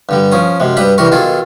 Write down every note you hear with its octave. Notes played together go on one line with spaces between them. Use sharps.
G2 D3 G3
F3 C#4 D#6
F#2 C3 G#3
G2 G3 B4 B5 D#6
C2 E3 G3 A#4 C#6
B1 D#3 F4 G#4 A4